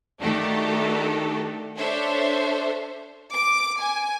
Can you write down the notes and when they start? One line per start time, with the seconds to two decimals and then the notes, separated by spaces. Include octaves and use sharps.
0.21 D#3 A3 D4 F#4 G4 A4
1.78 D4 A4 C5 C#5 E5
3.32 D6
3.80 G#5